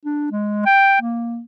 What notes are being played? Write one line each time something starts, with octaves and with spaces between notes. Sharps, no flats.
D4
G#3
G5
A#3